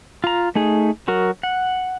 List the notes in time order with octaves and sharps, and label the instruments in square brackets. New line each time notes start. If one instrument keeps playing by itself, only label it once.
[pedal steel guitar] F4 A#5
A3 D#4 G#4
F#3 F#4 A#4
F#5